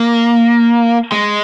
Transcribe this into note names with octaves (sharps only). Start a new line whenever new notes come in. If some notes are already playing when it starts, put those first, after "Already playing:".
Already playing: A#3
G#3